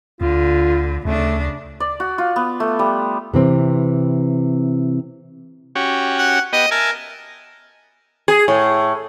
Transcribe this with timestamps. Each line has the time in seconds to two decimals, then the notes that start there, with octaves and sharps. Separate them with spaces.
0.21 D2 D3 F4
1.05 D2 C#3 A3 D4
1.80 D5
2.00 F#4
2.18 F4
2.36 B3
2.60 A3
2.79 G3
3.34 C3 E3 C4
5.76 C#4 F#4 G4
6.18 F#5
6.53 B3 G4 D#5
6.71 A#4 E5 G#5 A5
8.28 G#4
8.48 A2